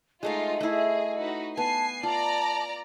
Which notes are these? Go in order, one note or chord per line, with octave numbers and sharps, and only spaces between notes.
G#3 A3 D#4 F4 D#5 F5
A3 E4 G#4
D#4 F#4 B4
B3 G#5 A5 C7
F4 D5 A5 A#5